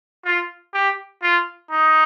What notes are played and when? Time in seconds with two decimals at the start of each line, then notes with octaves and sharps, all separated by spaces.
0.25 F4
0.74 G4
1.23 F4
1.71 D#4